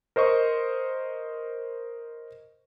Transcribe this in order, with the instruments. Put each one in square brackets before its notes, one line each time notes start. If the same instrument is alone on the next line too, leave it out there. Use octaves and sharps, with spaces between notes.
[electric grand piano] A#4 C5 D#5 C#6